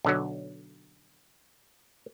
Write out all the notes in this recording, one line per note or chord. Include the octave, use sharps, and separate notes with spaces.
B1 D3 F#3